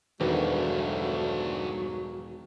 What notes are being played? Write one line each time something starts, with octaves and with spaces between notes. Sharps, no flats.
E1 D2 G2 D3 D#3 F#3 B4